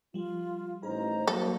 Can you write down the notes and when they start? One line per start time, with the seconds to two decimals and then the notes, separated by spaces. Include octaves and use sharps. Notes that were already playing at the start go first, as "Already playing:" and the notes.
0.14 F3 G3 F4
0.83 A1 D#4 G#4 C5 A#5
1.27 F#3 G3 A#3 A4 D5